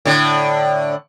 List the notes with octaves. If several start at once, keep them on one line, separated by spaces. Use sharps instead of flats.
A2 D3